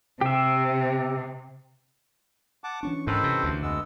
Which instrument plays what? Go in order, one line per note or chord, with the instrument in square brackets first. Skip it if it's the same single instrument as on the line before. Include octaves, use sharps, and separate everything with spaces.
[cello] C3 [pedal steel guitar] G4 E5
[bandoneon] F#5 A5 D6
[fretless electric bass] E3 C#4 D4 [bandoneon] C#6
[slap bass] G#2 [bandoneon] D#3 A4 B4 [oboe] C5
[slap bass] C3
D2
[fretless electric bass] F2 [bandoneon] G#3 B3 E6